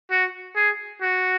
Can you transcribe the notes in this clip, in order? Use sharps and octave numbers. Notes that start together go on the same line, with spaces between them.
F#4
G#4
F#4